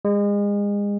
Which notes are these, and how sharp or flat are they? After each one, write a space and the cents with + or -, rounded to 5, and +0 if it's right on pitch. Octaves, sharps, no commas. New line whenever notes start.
G#3 -35